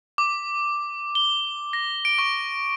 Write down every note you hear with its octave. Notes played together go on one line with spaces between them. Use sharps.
D6
G7
A#6
D7
C#6